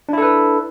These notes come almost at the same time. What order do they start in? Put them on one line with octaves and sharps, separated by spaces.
D4 E4 A4 B4